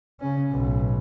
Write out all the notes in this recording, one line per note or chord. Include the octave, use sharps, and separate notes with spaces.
C#3 C#4
B1 A2